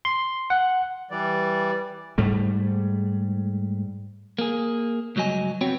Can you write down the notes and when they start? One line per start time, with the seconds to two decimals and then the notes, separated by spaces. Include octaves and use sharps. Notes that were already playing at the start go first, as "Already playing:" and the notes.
0.05 C6
0.50 F#5
1.11 E3 G3 D5
2.18 G#2 G3 A3
4.38 A#3 G#4
5.16 C#2 G2 F#3 D#5 G#5
5.61 B3 C4 F#4 C#5 G5